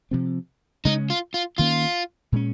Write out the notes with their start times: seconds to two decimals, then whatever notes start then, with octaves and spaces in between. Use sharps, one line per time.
0.11 C3 F3 C4
0.85 C#3 G#3 C#4 D#4
1.10 F4
1.34 F4
1.58 D#3 A#3 C#4 F4
2.32 A#2 G#3 C#4